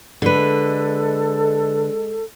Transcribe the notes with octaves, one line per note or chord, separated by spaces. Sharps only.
D3 G#3 A4 B4